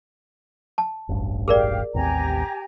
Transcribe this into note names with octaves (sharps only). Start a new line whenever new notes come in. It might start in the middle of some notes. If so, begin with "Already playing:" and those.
A5
E1 A1 G2
G4 G#4 A#4 D5 F5
A1 D#2 C4 G4 G#5 A#5